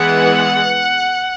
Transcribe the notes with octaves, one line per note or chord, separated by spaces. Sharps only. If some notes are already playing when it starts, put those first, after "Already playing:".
Already playing: E3 G#3 B3 F#5